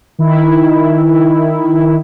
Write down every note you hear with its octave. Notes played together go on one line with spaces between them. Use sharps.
D#3 E4